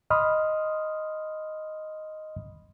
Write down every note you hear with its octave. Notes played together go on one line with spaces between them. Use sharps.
D#5 B5 C6 D#6 F6